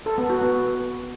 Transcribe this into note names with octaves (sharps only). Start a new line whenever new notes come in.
A4
B3
F#4
B3